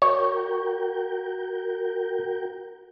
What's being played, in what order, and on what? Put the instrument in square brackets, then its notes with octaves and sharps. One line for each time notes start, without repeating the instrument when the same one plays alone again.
[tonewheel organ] F#4 A#4 G5 [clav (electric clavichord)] C#5